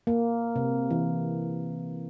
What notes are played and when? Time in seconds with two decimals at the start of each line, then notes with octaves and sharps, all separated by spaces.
0.07 A#3
0.56 C3
0.91 E3